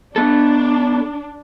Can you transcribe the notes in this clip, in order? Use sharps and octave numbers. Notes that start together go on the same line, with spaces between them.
B3 D4 A4